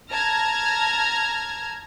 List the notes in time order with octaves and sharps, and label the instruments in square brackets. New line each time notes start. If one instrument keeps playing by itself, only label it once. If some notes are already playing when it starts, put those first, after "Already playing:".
[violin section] A5 A#5 F6 G#6 A#6